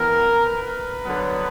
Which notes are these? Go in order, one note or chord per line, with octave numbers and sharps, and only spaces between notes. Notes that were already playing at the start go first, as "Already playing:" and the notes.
Already playing: E3 B3 A#4
B4
D3 F#3 B3